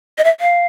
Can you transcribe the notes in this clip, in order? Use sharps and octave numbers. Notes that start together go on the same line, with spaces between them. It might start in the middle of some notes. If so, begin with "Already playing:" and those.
D#5
E5
F5